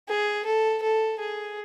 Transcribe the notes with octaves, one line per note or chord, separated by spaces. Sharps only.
G#4
A4
A4
G#4